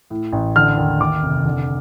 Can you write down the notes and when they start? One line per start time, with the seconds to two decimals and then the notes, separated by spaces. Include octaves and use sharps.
0.10 A2
0.33 A1
0.56 D3 F6
0.78 D#2
1.00 D#2 D6
1.23 F1
1.45 D3